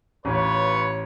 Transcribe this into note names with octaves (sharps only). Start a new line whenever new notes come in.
A1 F4 B4 C#5